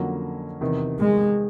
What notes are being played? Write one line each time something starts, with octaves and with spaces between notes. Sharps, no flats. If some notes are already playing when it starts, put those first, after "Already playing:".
Already playing: F2 D3 F#3 A#3 C#4
E2 C3 D#3
G#3